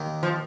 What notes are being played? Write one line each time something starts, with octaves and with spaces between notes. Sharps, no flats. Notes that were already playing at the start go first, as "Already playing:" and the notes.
Already playing: D#2 D#3
F3